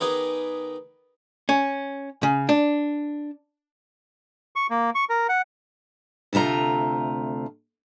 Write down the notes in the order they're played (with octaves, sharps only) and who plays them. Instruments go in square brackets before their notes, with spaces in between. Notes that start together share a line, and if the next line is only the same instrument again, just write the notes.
[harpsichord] D#3 B3 D#4 G#4 B4 D6
[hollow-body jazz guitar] C#4
C#3
D4
[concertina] C#6
A#3
C#6
A#4
F#5
[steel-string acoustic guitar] D2 C3 A3 F4 A#5